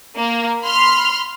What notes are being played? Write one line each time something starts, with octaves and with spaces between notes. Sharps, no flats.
A#3
B5 C6 F6